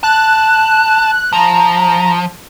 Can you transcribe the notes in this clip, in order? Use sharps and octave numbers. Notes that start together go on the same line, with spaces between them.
A5 F#6
F3 A#5